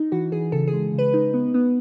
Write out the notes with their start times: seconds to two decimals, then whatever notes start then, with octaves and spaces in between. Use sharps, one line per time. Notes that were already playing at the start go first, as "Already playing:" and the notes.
Already playing: D#4
0.12 E3 F#4
0.32 E3 G#4
0.52 C#3 A4
0.67 G#4
0.73 G#3
0.94 C#3 B4
1.14 D#4
1.34 B3
1.54 B3